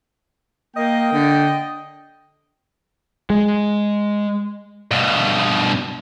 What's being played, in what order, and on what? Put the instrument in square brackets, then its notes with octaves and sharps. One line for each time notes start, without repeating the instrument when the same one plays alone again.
[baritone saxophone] A#3 [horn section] D#5 G5
[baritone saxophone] D3
[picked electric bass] G#3
[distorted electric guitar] G2 B2